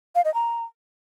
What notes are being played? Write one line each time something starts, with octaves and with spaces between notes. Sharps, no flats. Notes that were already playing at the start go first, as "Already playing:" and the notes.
F5
D#5
A#5